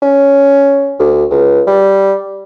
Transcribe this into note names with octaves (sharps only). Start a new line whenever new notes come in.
C#4
D2
C#2
G3